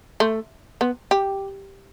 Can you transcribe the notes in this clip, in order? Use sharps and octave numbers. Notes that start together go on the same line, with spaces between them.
A3
B3
G4